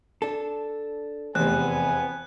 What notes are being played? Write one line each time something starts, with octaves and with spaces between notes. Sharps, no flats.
D4 A4
F1 E2 B3 C4 G#5 F#6